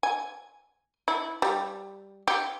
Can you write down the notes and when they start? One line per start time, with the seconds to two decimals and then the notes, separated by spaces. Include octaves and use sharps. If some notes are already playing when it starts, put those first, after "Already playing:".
0.03 G#5
1.08 E4
1.42 G3
2.28 G4